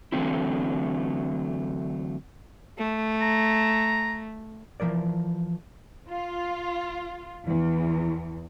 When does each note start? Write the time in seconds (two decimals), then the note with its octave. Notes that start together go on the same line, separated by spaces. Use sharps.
0.12 D3 E3 F#3 A3 C4 E4
2.78 A3
3.21 A#5
4.80 E3 F3 A#4 D5
6.09 F4
7.46 E2